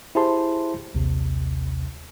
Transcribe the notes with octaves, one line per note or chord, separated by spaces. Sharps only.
E4 G4 G#4 C5 A5 C6
A#1 D#2 C3